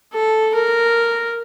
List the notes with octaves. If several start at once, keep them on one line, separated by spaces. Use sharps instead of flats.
A4
A#4